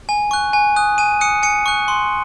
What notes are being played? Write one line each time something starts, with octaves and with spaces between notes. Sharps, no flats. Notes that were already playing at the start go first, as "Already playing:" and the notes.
G#5
C#6 F#6
G#5
D#6 F#6
G#5 D#7
D#6 F#6 C#7
G#5 C#7
C#6 F#6
C6